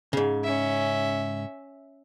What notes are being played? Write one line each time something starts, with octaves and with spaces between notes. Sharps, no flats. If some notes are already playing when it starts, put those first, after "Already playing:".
G#2 C#3
C#4 E5